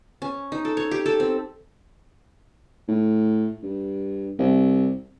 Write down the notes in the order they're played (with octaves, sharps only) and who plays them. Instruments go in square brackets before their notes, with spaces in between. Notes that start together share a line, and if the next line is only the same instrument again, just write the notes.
[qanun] C#4
D#4
A4
C#5
G4
A4
C4
[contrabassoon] A2
G2
C2